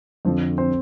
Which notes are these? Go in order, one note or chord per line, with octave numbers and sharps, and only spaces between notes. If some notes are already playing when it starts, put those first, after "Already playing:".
F2 D3 F3 C4 C5
C4 C5